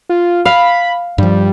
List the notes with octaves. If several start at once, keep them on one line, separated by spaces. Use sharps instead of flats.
F4
F5 B5
G2 F3 G3